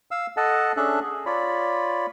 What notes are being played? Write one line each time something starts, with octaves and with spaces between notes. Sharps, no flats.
F5 E6
A4 D#5 F#5 A5
C#4 D4 G#4 A4 E5 F#6
G#4
F4 C#5 D5 B5